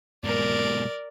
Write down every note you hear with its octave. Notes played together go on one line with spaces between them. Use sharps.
G#2 B2 A#4 D5